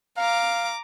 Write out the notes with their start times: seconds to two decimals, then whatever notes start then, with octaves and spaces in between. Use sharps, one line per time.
0.17 F5 A#5 D6